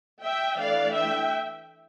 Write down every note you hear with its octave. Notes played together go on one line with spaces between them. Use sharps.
E5 G5
E3 A3 D4 D5 F5
E5 G5